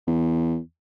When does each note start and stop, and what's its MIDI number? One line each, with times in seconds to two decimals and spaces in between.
0.07 0.58 40